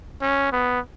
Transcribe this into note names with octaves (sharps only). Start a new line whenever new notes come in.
C#4
B3